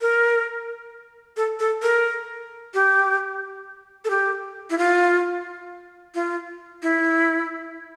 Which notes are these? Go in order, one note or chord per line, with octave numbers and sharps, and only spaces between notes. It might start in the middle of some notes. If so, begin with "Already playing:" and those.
A#4
A4
A4
A#4
G4
A4
G4
E4
F4
F4
E4